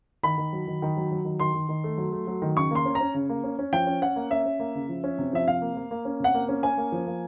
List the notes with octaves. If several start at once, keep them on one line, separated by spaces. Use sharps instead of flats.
D#3 B5
D#3
F#3
D#3
D#3
F#3
F#3
D#3
D#3 C6
D#3
D#3
A3
F#3
A3
F#3
D#3
C#3 C#6
A#3 C6
C#4
A#5
C#4
C#3
A#3
C#4
C#4
F3 G5
C#4
C#4 F#5
A#3
C#4 E5
C#4
A#3
C#3
F3
C#4
C3
F3 E5
C3 F5
A#3
A#3
A#3
C#4
C3 F#5
A#3
C#4
C#4 G#5
A#3
F3
A#3